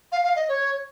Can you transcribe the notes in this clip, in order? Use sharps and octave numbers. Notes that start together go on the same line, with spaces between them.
F5
F5
D#5
C#5